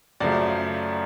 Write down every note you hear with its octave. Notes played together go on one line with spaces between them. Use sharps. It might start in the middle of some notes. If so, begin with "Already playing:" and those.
F#2 C#3 F3 A3 D5